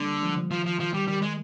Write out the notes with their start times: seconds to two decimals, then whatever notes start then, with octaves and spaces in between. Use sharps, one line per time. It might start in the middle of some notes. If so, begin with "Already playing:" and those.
Already playing: D3 G3 A#3
0.23 F3 G#3
0.36 D3 F3
0.51 D#3 F3
0.66 F3
0.80 D#3 F3
0.94 G3
1.08 D#3 G3
1.22 G#3